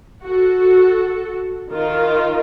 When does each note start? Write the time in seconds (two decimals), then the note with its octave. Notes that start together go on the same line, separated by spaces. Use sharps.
0.22 F#4 A4
1.70 D#3 F4 A#4